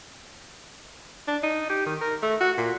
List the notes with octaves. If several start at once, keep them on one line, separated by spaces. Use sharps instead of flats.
D4
D#4
G4
D#3
A#4
A3
F#4
A#2